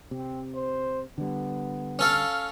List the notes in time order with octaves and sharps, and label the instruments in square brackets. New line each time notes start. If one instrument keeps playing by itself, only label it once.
[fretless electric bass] C3 [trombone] C4
[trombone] C5
[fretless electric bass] D3 G3 [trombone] B3
[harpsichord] C#4 A4 F5